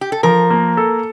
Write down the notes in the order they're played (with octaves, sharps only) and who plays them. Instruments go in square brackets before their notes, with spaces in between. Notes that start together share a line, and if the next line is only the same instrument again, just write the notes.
[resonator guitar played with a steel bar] G4
A4
[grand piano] F3 [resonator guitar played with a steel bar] A#4
[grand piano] A#3
A4